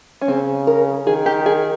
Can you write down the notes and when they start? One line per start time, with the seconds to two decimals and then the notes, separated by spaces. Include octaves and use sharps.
0.21 C#4
0.28 C#3 C4
0.67 A#4
1.07 D#3 G#4
1.26 G4
1.46 G#4